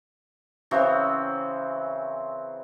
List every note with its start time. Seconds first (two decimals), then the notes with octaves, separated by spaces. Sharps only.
0.71 C#3 E3 F#3 C4